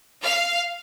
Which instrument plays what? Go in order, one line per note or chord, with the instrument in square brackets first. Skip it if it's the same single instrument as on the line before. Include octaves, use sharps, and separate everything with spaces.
[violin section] F5